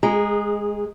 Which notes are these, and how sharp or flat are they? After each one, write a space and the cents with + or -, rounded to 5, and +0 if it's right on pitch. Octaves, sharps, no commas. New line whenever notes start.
G#3 +0 G#4 -25 A#5 +0